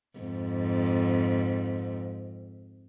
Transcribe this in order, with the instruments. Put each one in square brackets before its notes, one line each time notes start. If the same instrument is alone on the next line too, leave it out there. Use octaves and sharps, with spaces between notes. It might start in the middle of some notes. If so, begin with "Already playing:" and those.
[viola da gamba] F2 G#2